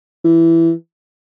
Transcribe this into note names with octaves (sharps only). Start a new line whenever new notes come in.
E3